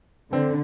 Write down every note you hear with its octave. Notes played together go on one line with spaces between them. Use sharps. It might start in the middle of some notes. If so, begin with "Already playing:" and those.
D3 C4